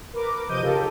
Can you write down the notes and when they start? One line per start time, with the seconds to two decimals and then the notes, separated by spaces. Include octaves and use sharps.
0.13 A#4 B4 D6
0.49 C3 F3 D#5 D6 G6 D#7
0.62 C#3 D#4 F4 G4 A4 A#4